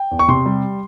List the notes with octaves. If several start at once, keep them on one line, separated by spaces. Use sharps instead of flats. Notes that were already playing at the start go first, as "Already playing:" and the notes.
Already playing: G5
E2
C#6
C3 C6
G3